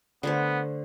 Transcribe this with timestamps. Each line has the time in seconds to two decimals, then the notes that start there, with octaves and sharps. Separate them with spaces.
0.23 D3 A3 B3 C5